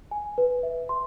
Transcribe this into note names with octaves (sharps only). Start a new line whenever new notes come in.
G#5
B4
E5
C6